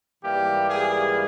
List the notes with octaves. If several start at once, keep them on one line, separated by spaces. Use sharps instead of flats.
G#2 E3 G3 A#3 G4
G#4